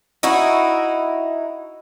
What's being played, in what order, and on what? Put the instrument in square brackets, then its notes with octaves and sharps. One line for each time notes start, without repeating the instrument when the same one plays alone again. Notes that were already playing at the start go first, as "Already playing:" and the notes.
[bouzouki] D#4 E4 F#4